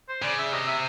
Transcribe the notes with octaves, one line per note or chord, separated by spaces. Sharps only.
C5
C#3 D5
E5
C3 D#5
E5